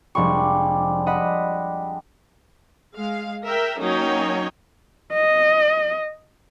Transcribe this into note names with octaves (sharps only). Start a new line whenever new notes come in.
F1 G3 G#3 D4 C#6
D#5 F#5 B5
G#3 F5
A#4 E5 G5
F#3 A#3 C#4 D#4 C#5 G5
D#5